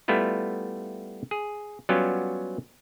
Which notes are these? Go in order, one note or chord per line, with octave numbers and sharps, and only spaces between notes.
G3 A3 B3 E4 F4
G#4
F#3 G3 B3 C#4 F4 G4